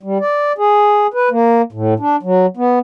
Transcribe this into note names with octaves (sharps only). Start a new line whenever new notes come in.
G3
D5
G#4
B4
A#3
A2
D4
F#3
B3